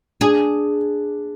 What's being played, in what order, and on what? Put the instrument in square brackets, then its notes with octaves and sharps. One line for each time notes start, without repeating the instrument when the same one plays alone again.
[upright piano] D4 [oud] G#4